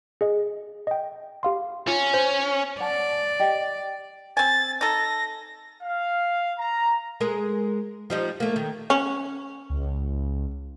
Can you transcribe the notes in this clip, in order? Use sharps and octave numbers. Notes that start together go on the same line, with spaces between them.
G#4 D#5
D#5 G5
G4 F5 C6
C#4 F4
C5
D5 F#5 A5
G4 D#5 G5
C4 G#5 A6
D#4 A4 A#6
F5
A#5
G#3 G#4 A#4
F3 G3 D#4
A3 A#3
D#3
C#4
C#2